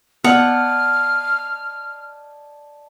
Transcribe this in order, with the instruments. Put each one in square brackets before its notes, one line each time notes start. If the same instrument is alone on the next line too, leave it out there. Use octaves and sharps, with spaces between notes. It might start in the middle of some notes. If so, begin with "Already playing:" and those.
[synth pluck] B3 [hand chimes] D5 D#5 A5 [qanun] F#5 [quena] F6